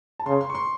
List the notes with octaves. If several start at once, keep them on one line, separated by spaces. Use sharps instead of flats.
A5
C#3 C6
C6
C#6
C6